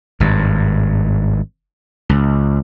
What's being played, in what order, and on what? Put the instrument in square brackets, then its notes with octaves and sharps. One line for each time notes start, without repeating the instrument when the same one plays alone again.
[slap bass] G#1 G2
C#2